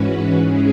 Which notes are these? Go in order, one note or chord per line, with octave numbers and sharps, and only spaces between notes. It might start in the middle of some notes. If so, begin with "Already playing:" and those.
Already playing: G#2 E3 C#4 F#4 B4
G#2 G#3 C#4 E4 G#4